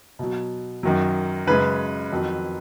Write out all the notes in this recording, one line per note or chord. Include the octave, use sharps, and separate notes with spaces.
B2 F#3
F#2 D#3 F#3
F#2 C#3 G#3 B4
F2 D#3 F#3